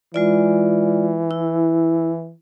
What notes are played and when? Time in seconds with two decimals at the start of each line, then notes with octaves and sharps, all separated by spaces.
0.14 E3 G#3 F4 D5
1.31 E4